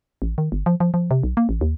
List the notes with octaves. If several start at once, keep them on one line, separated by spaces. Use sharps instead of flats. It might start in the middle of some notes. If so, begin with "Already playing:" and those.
A1
D#3
G1
F3
F3
F3
C3
B1
A#3
A1
D#2